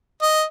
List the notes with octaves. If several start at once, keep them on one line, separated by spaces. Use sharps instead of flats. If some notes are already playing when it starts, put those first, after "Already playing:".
D#5